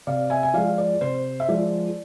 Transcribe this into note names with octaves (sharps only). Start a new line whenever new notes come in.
C3 D5 F5
E5 G#5
G#5
F3 G#3 D5 F5
D5
C3 C5
E5
F3 G#3 D5